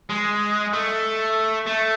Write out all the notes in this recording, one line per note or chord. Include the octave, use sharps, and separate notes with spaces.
G#3
A3
A3